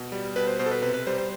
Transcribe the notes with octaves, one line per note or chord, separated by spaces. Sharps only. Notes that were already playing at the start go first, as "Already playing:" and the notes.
Already playing: B2
G3
B2 B4
C5
B2 C5
A4
B4
C3 B4
B4
G3 C5
C5